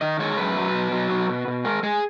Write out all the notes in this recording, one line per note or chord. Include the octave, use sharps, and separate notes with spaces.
D#3 D#5
G#3 C#5
F#2 B4
F#3
B2
F#3
B2
B2
B2
G#3 A#4
G#3 G#4